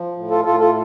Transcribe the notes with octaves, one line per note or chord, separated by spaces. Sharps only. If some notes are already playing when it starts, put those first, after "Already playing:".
Already playing: F3
A2
F4 A4
A2 F4 A4
F4 A4